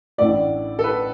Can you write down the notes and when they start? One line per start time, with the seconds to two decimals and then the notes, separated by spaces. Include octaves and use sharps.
0.18 A1 A2 A3 D4 D5
0.79 A4
0.84 B4